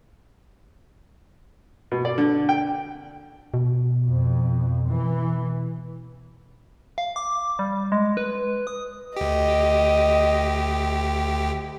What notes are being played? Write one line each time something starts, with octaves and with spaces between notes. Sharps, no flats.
B2
D5
D3
G5
B2
F2
E3
F5
D6
G3
G#3
B4
D#6
D2 G4 D#5